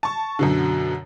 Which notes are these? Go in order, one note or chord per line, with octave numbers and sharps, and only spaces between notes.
A5 C#6
F#2 B2 D3